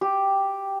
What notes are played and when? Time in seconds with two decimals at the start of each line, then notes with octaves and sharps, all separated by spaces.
0.01 G4